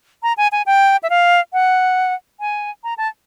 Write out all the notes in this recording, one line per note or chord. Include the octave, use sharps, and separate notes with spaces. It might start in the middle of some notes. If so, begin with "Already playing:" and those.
A#5
G#5
G#5
G5
E5
F5
F#5
G#5
A#5
A5